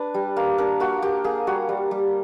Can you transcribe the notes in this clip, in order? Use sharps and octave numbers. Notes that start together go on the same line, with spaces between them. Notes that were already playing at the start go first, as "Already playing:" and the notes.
Already playing: D4 B4
G3
A#3
D4 A#4
A#3 F#4
A#3 G4
A#3 G#4
G3 F#4
G3
G3